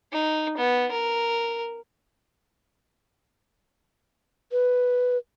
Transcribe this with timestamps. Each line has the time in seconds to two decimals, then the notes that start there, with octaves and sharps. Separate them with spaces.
0.12 D#4
0.57 B3
0.91 A#4
4.52 B4